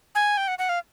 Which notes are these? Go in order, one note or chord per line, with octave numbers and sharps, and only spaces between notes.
G#5
G5
F#5
F#5
F5